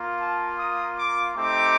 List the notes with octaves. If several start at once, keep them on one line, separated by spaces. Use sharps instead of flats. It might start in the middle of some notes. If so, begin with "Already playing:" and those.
Already playing: A#3 F4
A5
D#6
D6
A3 C4 D#4 G4 D6